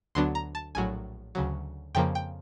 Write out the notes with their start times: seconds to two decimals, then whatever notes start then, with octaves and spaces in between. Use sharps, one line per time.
0.15 D2 D3 F#3 B3 D4 C6
0.35 A#5
0.55 A5
0.75 A#1 A2 F#3 G#5
1.35 D2 C#3 F#3
1.95 F2 C#3 F3 A#3 G5
2.15 G5